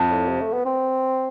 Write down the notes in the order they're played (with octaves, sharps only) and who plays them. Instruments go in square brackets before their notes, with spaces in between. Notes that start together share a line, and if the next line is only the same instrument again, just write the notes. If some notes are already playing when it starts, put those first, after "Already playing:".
Already playing: [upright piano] F2
[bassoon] A2
C3
A3
B3
C4